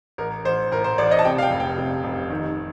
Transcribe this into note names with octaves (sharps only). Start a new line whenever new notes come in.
A1 A#4
A1 C5
A2 A#4
C5
A1 D5
D#5
A5
C3 G5
F5
G5
F1
G5
C3
F1
D#3